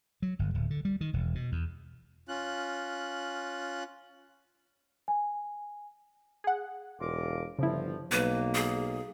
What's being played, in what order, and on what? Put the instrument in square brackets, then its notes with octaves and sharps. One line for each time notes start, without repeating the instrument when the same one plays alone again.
[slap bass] F#3
G1
D1
D3
G3
D#3
E1
B2
E2
[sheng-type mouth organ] C#4 F4 F#6
[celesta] G#5
[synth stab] G#4 F#5
[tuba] E1 [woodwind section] F4 A#4 D6
[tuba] G1 [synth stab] C#3 E4 [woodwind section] F3
[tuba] B1 [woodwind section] A#3 [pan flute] B4
[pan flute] G#4